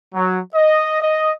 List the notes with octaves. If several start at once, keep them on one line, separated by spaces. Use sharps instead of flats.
F#3
D#5
D#5